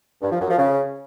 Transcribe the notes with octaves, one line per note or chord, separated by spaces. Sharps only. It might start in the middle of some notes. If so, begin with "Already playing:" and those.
G2
F3
F#2
F3
C#3